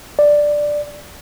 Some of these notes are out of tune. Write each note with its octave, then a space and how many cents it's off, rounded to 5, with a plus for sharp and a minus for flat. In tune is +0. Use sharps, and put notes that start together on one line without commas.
D5 +5